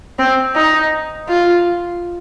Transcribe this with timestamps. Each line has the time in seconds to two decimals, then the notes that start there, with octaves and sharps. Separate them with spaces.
0.18 C4
0.55 D#4
1.29 F4